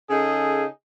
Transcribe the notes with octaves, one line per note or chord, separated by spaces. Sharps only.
C#3 D#4 G#4 A4